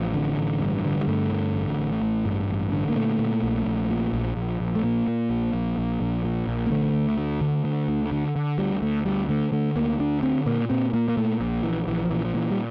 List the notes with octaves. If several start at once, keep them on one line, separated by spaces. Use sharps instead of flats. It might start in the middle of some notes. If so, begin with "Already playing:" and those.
Already playing: A1 F3
D3
A1
G2
D3
G3
G2 A3
D3
A1
A1
A1
G2
A1
D3
A#3
A#2 A3
A#2
A#1
A#1
A#2
A#1
A#1
A#1
A3
A#2 A#3
A#2
A#1
A#1
A#1
A#1
A#2
A#1
A#3
D3 A3
D2
D2
D3
D3
D2
D3
D3
D2 G3
D2 A3
D2 G3
D3 A3
D3 A3
D2 A#3
D2 D4
D3 C4
A#2 A#3
A#2 C4
A#2 A#3
A#3
A#2 A3
A#1
A#1 E3
A#1 E3
F3
A#2 E3
F3
A#2 E3
G3